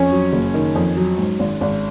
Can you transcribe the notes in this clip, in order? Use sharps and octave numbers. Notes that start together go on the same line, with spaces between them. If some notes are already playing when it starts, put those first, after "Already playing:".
Already playing: F2 C#4 C#5
F#3
F#1
D#3
F2
F#3
G#2
G#1
G#1